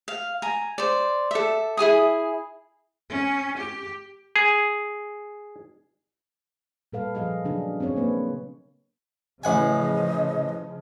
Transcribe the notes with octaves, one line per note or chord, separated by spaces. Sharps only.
F5
G#5 A#5
C5 D5
A4 E5
E4 G#4 G#5 D#6
C#4
G4
G#4
A#2 G3 A4 B4 F5
F3 G#4 D#5 F5
C#3 F#3 D4 G#4
C4 D4 G#4 C#5
A#3 B4
A1 C#3 F3 D#5 F#5 G#5